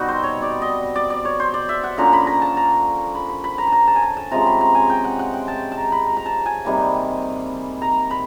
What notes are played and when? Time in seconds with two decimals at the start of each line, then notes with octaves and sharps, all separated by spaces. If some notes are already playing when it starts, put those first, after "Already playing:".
Already playing: B2 G3 C4 D#4 F#4
0.08 C5
0.23 C#5
0.42 D5
0.62 D#5
0.96 D5
1.10 D5
1.25 C#5
1.40 C5
1.54 D5
1.69 E5
1.84 F#5
1.98 D3 F3 A#3 C#4 A#5
2.13 B5
2.27 A#5
2.42 A5
2.57 A#5
3.15 B5
3.29 B5
3.44 B5
3.58 A#5
3.67 A5
3.72 A#5
3.87 A5
3.96 G#5
4.02 A5
4.17 A5
4.31 C3 F3 G#3 C#4 A#5
4.47 B5
4.61 A#5
4.75 G#5
4.90 G5
5.04 F#5
5.19 F#5
5.34 G5
5.48 A5
5.72 A5
5.77 A#5
5.92 B5
6.06 A#5
6.17 A#5
6.26 A5
6.46 G#5
6.65 C3 D#3 G3 A#3
7.82 A#5
8.11 B5